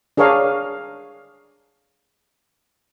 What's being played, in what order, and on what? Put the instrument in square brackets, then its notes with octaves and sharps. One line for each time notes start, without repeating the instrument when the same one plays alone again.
[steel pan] D4 G#4 A#4 C#5 F5